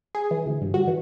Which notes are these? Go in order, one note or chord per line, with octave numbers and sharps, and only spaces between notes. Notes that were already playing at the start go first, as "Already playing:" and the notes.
G#4
E3
D2
G2
F#4
E3